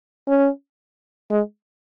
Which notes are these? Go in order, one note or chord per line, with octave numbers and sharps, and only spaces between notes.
C#4
G#3